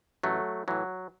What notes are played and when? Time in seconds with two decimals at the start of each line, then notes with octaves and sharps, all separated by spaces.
0.23 A1 F#3 A3
0.68 A2 E3 F#3